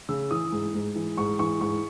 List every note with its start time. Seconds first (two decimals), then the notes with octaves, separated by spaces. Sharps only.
0.09 C#3 E6
0.31 E3 D#6
0.52 G#2
0.74 G#2
0.95 E3
1.18 G#2 C#6
1.39 E3 C#6
1.61 G#2 C#6